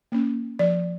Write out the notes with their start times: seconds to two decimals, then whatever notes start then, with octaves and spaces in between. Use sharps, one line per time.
0.12 A#3 C#4
0.59 F3 D5